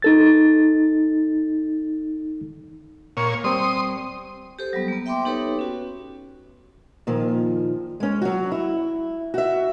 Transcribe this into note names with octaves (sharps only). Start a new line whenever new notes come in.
D#4 A4 A6
A#2 C#5
G3 C4 C6 D#6
G4 A4 C5
F#3 G3 B3
A#3 B3
E5 G5 B5 C6 D6
B3 D#4 G4 A4 B4 C#5
C#4 F#4
A#2 D#3 F3
G#3 C#4
F#3 F#4
E4
F#4 E5